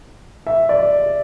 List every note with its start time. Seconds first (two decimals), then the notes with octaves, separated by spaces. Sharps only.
0.47 E5
0.69 D5